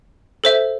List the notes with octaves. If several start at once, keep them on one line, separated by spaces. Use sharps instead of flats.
A4 C5 E5